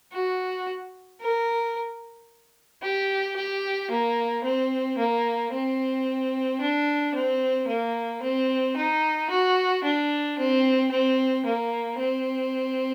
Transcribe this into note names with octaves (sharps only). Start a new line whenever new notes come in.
F#4
A#4
G4
G4
A#3
C4
A#3
C4
D4
C4
A#3
C4
D#4
F#4
D4
C4
C4
A#3
C4